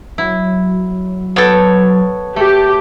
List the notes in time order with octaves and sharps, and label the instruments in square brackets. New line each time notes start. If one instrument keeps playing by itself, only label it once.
[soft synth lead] F#3 [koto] E4
[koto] B3 G5 [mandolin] A4 C#5
[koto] A3 [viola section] G4 [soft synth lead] A5